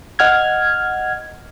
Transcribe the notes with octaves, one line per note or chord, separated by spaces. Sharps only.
D#5 F#5 F6 G#6